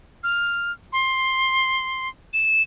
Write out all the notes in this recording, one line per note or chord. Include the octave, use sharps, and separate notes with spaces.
F6
C6
E7